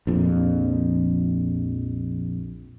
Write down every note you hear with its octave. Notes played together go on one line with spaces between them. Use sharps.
A#1 F2